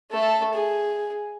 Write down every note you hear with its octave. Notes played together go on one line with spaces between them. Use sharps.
A3 A4
G#4